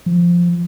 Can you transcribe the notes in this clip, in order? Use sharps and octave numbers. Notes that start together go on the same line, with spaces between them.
F3